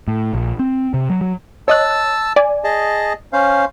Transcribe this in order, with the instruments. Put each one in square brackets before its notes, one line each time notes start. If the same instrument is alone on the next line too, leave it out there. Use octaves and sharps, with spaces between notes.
[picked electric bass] A2
A#1
C4
C3
F#3
F#3
[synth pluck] C#5 D#5 F#6 [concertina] A5 E6
[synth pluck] D5 G#5
[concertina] G#4 D#5 A5
C#4 C5 F5